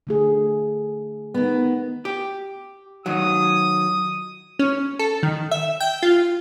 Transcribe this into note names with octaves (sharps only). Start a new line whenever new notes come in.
D3 A3 G#4
D#3 B3
G4
D#3 F#3 D#6
C#4
A4
D#3
E5
G5
F4